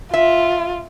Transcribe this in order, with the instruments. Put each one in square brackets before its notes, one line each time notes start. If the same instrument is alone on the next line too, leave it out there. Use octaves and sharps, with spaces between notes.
[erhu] F4 [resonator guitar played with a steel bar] E5